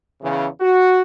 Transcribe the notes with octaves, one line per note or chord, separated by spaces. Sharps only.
E2 C#3
F#4